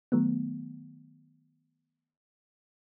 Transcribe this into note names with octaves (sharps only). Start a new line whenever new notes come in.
D#3 F#3 A3 B3